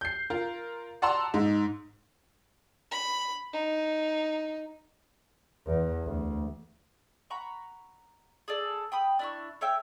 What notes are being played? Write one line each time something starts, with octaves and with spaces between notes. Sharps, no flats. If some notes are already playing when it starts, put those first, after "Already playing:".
G6 C7
F4 A#4
D5 F#5 A5 A#5 C6 E6
G#2
B5
D#4
E2
D2
F#5 A#5 B5 C#6
G#4 A4 D5
G5 B5 D#6
D4 E4 C#6
A4 C#5 E5 G5